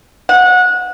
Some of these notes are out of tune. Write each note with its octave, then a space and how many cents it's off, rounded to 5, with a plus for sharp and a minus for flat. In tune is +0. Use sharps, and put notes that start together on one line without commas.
F#5 -25